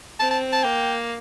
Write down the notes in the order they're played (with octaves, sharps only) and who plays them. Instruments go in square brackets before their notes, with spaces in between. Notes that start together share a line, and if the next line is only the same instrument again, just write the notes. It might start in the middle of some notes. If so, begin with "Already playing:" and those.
[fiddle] C4 [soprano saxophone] A5
[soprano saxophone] A5
A5
[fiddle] A#3 [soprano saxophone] G5